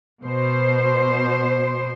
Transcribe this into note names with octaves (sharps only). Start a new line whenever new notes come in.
B2 C5